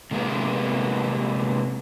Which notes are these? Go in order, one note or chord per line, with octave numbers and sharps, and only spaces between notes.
C3 G#3 A#3 B3